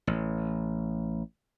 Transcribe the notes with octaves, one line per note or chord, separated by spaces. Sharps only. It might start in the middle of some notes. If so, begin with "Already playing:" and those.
A1